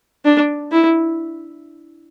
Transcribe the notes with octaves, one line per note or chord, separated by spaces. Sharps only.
D4
E4